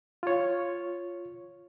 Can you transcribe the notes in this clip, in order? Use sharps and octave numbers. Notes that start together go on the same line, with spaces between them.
F4 C#5